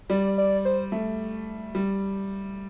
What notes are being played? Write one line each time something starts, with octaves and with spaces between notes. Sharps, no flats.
G3 D5
D5
C5
A3
G3